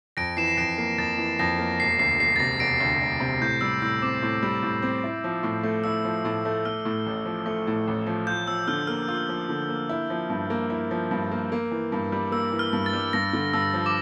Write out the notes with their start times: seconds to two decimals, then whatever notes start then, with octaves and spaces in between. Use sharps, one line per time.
0.17 F2 A#6 D7
0.37 E3 C7 E7
0.48 C7
0.57 F2 A#6 D7
0.78 A#3 C7
0.98 F2 A6
1.18 E3
1.39 F2 A#6
1.59 A#3
1.79 E1 C7
1.99 D2 C7
2.19 E1 C7
2.36 A6
2.40 C3 A#6
2.60 E1 A#6 D7
2.80 D2
3.01 E1
3.20 C3
3.41 A2 G6
3.61 G3 E6
3.82 A2 E6
4.02 C4 D6
4.22 A2
4.43 G3
4.63 A2
4.82 C4
5.04 E4
5.24 F3
5.43 A2
5.63 A3
5.84 E4 E6
6.05 F3
6.25 A2
6.45 A3
6.65 A3 F6
6.85 A2
7.06 A1
7.26 F3
7.46 A3
7.67 A2
7.87 A1
8.07 F3
8.27 F4 G6
8.48 F3 E6
8.68 D3 F6
8.87 A#3 F6
9.08 F4 E6
9.29 F3
9.49 D3
9.69 A#3
9.89 E4
10.10 F3
10.30 G2
10.50 A#3
10.70 E4
10.91 F3
11.11 G2
11.31 A#3
11.52 A#3
11.71 E3
11.92 G2
12.12 G3
12.32 A#3 E6
12.52 E3
12.59 F6
12.73 G2
12.86 A6
12.93 G3
13.13 G2 A#6
13.33 D3
13.53 G2 E6
13.74 F3
13.86 D6